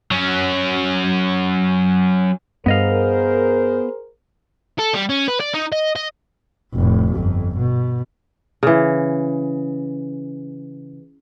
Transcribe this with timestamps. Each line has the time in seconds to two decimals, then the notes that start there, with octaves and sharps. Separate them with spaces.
0.11 F#3 C#4
2.66 G2 B3 G#4 A#4 C5 D#5 F5
4.79 A4
4.94 G3
5.09 C#4
5.28 B4
5.40 D5
5.54 D#4
5.72 D#5
5.96 D#5
6.75 F1 A2
7.12 G1 F2
7.57 B2
8.63 C#3 E3